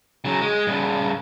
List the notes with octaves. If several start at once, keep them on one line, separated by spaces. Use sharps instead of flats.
C#3 F#3
G#3
G2 C#3